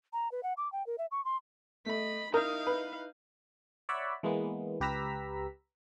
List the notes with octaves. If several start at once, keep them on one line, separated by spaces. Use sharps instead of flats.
A#5
B4
F#5
D6
G5
A#4
E5
C#6
C6
A3 D#5 B5
D#4 E4 A#4 F5 D#6 G6
B4
C#5 D5 E5 F#5 B5
E3 G#3 A#3 B3
C#2 G4 B4 A#5 E6 B6